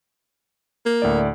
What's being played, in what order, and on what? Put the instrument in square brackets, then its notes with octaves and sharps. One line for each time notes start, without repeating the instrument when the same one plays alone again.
[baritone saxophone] A#3
[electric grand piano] D2 A2 D5